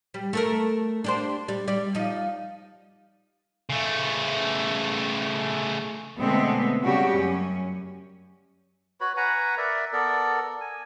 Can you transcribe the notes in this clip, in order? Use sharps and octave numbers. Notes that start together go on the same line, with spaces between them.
G3
A3 A4 A#4
D4 G4 C5
G3
G3 D5
F3 D#4
C#3 A3
B2 D3 G#3 A3 B3 C4
C#3 G3 F#4 G4
F#2 C#4
F#4 B4 C#5 B5
B4 F#5 G#5 A#5
A#4 D5 E5
B3 A4 A#4 D5
G#5